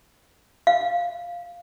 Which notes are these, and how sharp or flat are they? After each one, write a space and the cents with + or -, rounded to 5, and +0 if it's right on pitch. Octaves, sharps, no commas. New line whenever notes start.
F5 +0